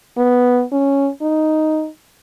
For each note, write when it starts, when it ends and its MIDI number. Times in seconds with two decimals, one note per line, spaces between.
0.17 0.63 59
0.72 1.09 61
1.22 1.88 63